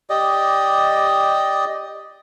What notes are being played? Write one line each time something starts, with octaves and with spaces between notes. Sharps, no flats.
G4 D5 D#5